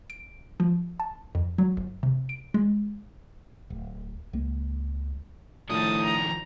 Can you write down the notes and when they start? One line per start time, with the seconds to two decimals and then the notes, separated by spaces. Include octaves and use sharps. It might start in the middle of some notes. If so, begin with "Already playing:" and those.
0.10 D7
0.60 F3
1.00 A5
1.35 F2
1.58 F#3
1.77 G1
2.03 C3
2.29 D7
2.54 G#3
3.70 D1
4.33 C#2 A#3
5.70 A2 D#3 F3 D4 D#4 A5 D#6
6.02 A#5